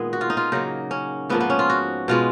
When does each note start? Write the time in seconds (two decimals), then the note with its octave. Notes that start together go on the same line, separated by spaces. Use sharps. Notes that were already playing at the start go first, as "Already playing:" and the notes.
Already playing: A#2 D#3 G#3 B3 G#4
0.13 F#4
0.21 F4
0.30 D#4
0.37 F4
0.52 C#3 F#3 A#3 D#4
0.91 C#4
1.30 G#2 F3 A#3 B3
1.41 B3
1.50 C#4
1.59 F4
1.70 F#4
2.08 B2 G#3 B3 F4